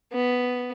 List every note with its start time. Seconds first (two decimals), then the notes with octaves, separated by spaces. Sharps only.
0.13 B3